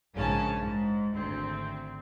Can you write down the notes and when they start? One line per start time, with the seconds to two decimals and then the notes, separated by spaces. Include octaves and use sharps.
0.15 A#1 G#2 C#3 C#4 A5
0.59 G#2
1.14 G#1 D2 C4